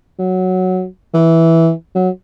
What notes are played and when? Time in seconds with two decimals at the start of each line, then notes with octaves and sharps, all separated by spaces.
0.19 F#3
1.14 E3
1.95 F#3